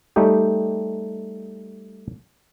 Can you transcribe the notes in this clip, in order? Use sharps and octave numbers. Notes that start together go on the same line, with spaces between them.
G3 A3 D#4 G4